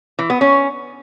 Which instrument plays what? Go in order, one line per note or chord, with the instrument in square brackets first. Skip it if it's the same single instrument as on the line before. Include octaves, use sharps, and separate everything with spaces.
[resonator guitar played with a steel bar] E3
B3
C#4